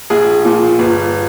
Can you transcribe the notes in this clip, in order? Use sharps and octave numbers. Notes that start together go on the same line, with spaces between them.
A#1 G#4
A#2 F3
G1